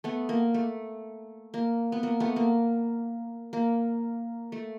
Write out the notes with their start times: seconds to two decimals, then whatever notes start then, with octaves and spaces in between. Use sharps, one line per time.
0.04 A3 B3
0.29 A#3
0.54 A3
1.54 A#3
1.92 B3
2.03 A#3
2.20 A3 B3
2.36 A#3
3.53 A#3
4.52 A3